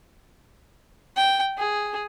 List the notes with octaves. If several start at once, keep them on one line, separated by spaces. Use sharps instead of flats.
G5
G#4